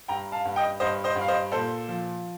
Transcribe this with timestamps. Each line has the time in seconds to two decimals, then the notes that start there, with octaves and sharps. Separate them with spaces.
0.08 G2 G5 A#5
0.32 F5 A5
0.45 G2
0.56 D#5 G5
0.80 G2 C5 D#5
1.04 C5 D#5
1.16 G2
1.21 F5
1.28 C5 D#5
1.52 A#2 A4 C5
1.88 F3